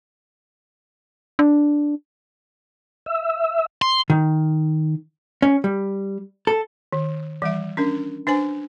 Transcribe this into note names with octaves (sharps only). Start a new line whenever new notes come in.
D4
E5
C6
D#3
C#4
G3
A4
D#3
E3 G3 E5
C#4 D4 A#4
D4 B4 C5 G#5